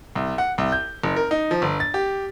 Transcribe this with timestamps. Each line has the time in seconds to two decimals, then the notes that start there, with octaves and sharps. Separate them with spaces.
0.15 C2
0.38 F#5
0.58 C2
0.72 G6
1.04 F#1
1.16 A#4
1.31 D#4
1.51 F3
1.62 G1
1.80 A6
1.94 G4